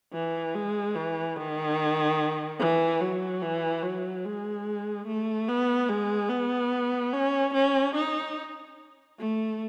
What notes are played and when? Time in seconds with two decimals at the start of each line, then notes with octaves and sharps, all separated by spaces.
0.13 E3
0.55 G#3
0.95 E3
1.36 D#3
2.59 E3
3.01 F#3
3.42 E3
3.83 F#3
4.25 G#3
5.07 A3
5.49 B3
5.89 G#3
6.30 B3
7.13 C#4
7.54 C#4
7.95 D#4
9.18 A3